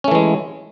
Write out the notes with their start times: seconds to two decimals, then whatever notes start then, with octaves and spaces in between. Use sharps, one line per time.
0.04 C#4
0.08 A3
0.11 E3
0.15 G#3